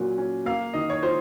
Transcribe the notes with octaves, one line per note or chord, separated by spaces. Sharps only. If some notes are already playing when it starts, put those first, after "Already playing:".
Already playing: A#2 F#3 C#4
C#4
A#3 F5
D#3 D#5
C#5
F4 C5